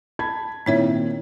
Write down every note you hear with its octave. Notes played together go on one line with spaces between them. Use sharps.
A5 B5 G#6
A#2 D#3 C4 E4 C#5 E5